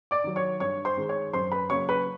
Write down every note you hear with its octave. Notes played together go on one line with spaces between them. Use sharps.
D5 D6
D#3 F#3
C#5 C#6
G2 C#5 C#6
C5 C6
D#3 G#3
C#5 C#6
F#2 C5 C6
B4 B5
C#3 F#3 A#3 C#5 C#6
B4 B5